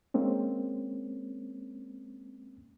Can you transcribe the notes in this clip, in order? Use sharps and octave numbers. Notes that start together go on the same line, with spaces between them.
G#3 A#3 C4 C#4